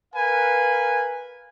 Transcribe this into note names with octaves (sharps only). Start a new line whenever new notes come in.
A#4 B4 F5 G#5